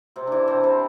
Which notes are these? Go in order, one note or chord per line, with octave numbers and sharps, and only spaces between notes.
C3 C4
E3 D4 E4
C3 C4
C3 C4